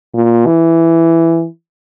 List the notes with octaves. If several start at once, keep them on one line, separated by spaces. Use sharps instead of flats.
A#2
E3